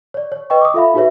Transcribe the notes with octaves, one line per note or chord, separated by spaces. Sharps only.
C#5 D5
C#5
B4 D#5 G5 C#6
D6 D#6
F4 A4 E5 F5 B5
D#4 F#4 G#4 B4 C#5 E5